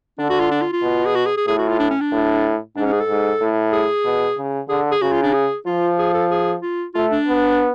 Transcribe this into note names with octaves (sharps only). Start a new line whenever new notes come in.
D3 D4
F#4
F4
D4
F4
F4
B2
G#4
F#4
G#4
G#4
A2 G#4
F#4
F4
D4
C#4
D4
A2
G#2 D4
C#4
G#4
A4
G#2
A2
G#4
B2
C#3
D3 G#4
G#4
C#3 F#4
F4
D4
G#4
F3 F4
G#4
A4
G#4
F4
A3 F4
D4
B3